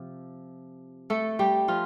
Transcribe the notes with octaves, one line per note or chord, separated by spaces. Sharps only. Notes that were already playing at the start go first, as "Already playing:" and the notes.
Already playing: C3 F3
A3 A4
G3 G4
F3 F4